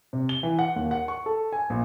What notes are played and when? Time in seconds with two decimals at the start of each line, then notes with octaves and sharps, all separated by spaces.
0.13 C3
0.29 G7
0.43 E3
0.59 F#5
0.76 D#2
0.91 F#5
1.08 C#6
1.26 A4
1.53 G#5
1.70 A#1